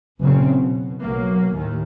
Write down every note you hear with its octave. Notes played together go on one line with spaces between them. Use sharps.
F#1 A#2 C#3 C4
B2
B1 F#3 A#3
D#2 A2 D#3